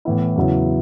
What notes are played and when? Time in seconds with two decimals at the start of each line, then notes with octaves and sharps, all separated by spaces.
0.05 A2 E3 B3 E4
0.36 E2 C#3 F#3 B3 E4